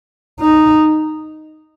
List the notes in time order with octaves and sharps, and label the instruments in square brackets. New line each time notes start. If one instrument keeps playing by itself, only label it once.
[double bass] D#4